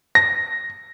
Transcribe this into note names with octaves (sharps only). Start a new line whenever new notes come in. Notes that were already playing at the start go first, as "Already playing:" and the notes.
A#6